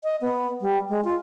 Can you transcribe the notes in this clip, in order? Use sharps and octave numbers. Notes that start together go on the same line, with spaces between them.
D#5
B3
G3
G#3
F4